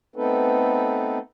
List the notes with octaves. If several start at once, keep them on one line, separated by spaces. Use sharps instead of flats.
A3 B3 C4 D#4 A4 B4